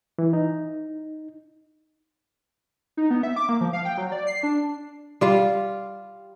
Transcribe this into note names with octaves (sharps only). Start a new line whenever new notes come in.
E3
D#4
D#4
B3
E5
D6
A#3
F3
F5
G5
F#3
D5
C7
D4
G3 F4 F5